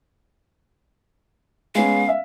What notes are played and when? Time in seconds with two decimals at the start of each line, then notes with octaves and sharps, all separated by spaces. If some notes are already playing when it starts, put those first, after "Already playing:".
1.75 G#3 B3 C#4 F5
2.07 E5 F5